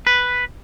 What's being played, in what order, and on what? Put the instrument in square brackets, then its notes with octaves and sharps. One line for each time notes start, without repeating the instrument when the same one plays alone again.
[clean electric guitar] B4